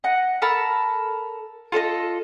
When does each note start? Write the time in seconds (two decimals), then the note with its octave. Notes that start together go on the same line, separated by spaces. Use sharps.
0.04 D#5 F#5
0.42 A4 A#4 A5 B5
1.72 F4 A4 C5 D#5